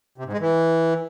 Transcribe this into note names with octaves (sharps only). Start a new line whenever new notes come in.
C3
G#2
G#3
E3